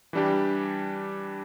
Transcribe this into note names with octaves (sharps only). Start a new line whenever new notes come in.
E3 G3 D4 G4